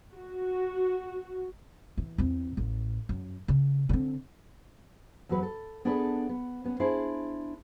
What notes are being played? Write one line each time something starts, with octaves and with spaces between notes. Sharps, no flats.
F#4
E3
E2 C4
A1
F#2
C#3
D3 C4
E2 F#3 F#4 B4
A4
B3 D4 G#4 A4 B4 D5
B3
B3 C#4
D4 E4 G#4 C5